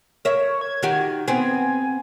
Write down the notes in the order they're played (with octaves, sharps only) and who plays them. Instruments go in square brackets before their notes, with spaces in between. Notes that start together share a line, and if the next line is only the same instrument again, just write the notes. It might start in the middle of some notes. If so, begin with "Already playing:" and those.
[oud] A#4 E5 [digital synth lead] C#5
[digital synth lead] G#6
[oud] D#3 F#4 G4
[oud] B3 C4 [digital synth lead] G#5